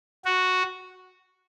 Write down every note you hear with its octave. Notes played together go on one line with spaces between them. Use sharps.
F#4